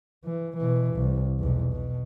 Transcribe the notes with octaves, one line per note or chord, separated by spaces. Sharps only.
E3
B2 E3
C2
B1 E2
B2